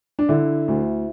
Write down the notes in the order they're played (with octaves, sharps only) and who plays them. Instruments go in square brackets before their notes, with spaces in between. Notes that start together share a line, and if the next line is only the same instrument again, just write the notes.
[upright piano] D4
D3 E4
D2